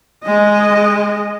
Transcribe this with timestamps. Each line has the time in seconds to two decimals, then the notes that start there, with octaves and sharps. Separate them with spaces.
0.24 G#3 D#5